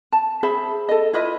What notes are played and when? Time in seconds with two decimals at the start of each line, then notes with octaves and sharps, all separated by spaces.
0.12 A5
0.43 G#4 C5 E5 B5
0.89 A4 D#5
1.13 E4 F4 B4 D#5